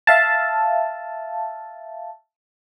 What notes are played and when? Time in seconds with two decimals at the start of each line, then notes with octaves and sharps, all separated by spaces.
0.07 E5 F5 A5